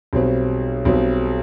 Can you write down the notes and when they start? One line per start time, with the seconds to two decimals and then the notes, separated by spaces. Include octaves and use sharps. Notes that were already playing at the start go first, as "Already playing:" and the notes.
0.13 B1 B2 G3 C4
0.85 B1 B2 G3 C4